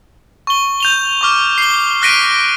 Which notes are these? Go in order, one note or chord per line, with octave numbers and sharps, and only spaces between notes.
C#6 G7
G6 F7 G7
C#6 D6 F6
C7 G7
F6 F#6 A#6 B6 D7 D#7